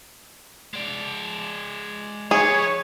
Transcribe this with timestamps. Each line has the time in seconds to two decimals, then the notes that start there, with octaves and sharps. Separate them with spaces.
0.74 G#3 D5
2.31 F3 G#4 B4 C#5